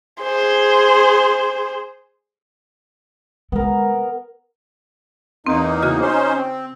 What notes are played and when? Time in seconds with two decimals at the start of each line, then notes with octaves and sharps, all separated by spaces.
0.22 G#4 C5
3.52 D3 G#3 B3 A#4
5.46 E2 A#3 C4 D#4
5.82 C#3 F#4 F6
6.01 C#4 D#4 C5
6.36 C4